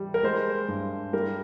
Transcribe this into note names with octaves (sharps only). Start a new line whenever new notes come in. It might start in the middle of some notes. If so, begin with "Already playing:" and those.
Already playing: E3 G3
A#4
G#3 C5
G2
G3 A#4